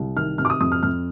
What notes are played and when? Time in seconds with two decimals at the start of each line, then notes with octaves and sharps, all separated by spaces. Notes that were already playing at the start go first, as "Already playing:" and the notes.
Already playing: C2
0.16 D#3 F6
0.38 C3 F6
0.45 D6
0.50 D#6
0.61 F2 D#6
0.72 F6
0.83 F2 F6